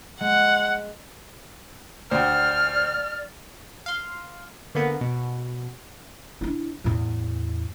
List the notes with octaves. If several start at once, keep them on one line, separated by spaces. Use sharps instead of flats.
G#3 F#5
D2 C5 D5 G5 F6
F5 C6
D3 A#3 B3
B2
D4 E4
E2 A2